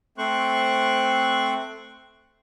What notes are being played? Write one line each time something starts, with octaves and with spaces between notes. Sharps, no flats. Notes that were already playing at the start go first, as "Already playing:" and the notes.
A3 C4 C5 C#6 F#6